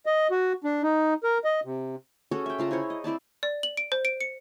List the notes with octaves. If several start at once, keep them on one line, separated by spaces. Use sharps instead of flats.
D#5
F#4
D4
D#4
A#4
D#5
C3
C#4 F#4 G#4 A4
E5 G5
C#3 F4 A5 A#5
E4 G#4 C5 C#5
D#5
C4 E4 D5 A5
D5
F#7
D7
C5
D7
C#7